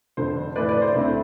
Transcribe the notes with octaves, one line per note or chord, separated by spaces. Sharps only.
F1 F2 D3 C5
A2 E3 A3 B4 D5
B4 D5
C5
D2 D3 A3 C4 E4